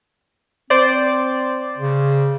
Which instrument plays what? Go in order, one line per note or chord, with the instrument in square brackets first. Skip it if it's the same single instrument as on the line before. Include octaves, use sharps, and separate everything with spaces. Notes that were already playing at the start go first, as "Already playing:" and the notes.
[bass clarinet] C4 [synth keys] C5 D5
[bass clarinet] C#3